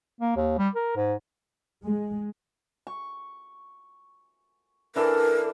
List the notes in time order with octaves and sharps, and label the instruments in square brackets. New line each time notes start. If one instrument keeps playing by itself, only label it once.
[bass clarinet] A#3
D#2
G3
A#4
G#2
[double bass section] G#3
[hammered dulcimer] C#6
[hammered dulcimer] E3 D4 A4 [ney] A#4